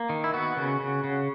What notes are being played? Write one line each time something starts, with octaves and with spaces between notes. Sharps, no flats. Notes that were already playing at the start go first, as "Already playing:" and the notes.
Already playing: A#3
D#3
E4
B3 F#4
C#3
C#3
C#3